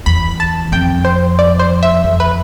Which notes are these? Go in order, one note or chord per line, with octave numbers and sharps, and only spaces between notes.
E2 B5
A5
F2 G5
C5
D5
C5
E5
F2
B4